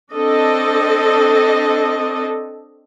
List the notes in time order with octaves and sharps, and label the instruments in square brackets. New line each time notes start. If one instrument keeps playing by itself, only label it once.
[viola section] C4 D4 A4 D#5